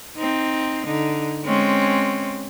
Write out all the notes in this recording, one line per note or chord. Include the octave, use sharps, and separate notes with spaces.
C4 D#4
D3 D#4
G#3 C4 C#4